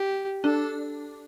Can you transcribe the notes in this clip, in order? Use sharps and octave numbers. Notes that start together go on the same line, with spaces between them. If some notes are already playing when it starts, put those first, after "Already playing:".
Already playing: G4
D4 A4